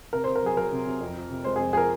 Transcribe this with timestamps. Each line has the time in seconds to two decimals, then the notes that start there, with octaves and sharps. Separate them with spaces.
0.13 C3 A#4
0.24 C5
0.28 C3
0.36 A#4
0.43 F#3 G#4
0.56 F#3 A#4
0.72 C3
0.86 C3
1.01 F2
1.16 F3
1.30 C3
1.44 G#3 C5
1.56 G#4
1.59 F2
1.73 F3 G#4 A#4